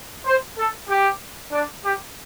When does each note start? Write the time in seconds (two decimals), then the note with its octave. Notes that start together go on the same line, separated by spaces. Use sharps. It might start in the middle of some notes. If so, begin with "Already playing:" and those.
0.26 C5
0.57 A4
0.88 G4
1.51 D4
1.83 G4